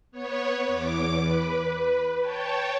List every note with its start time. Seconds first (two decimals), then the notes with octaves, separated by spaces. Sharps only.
0.11 B3 C#5
0.68 E2 D6
1.21 B4
2.21 C#5 G5 A5